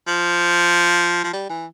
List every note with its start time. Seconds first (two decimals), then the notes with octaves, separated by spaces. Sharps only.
0.07 F3
1.24 F3
1.33 G3
1.50 E3